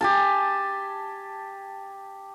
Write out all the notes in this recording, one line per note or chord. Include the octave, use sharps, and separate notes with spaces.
G4 G#5 A5